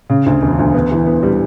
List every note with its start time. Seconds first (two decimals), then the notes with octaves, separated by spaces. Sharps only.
0.10 C#3
0.26 D2
0.42 E1
0.59 D2
0.74 B3
0.91 E3
1.06 B3
1.23 G3